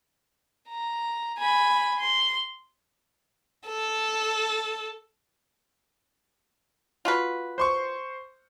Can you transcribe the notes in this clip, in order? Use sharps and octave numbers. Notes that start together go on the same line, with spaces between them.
A#5
G#5 B5
C6
A4
F4 F#4 B4
C5 C6 C#6